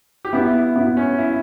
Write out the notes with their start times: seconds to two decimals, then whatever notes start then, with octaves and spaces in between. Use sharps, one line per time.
0.25 G4
0.33 B3 E4
0.54 E4
0.75 B3 E4
0.97 C#4
1.18 E4